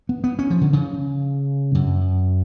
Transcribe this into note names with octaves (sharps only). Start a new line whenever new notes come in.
B3
B3
C#4
F3
D3
C#3
F#2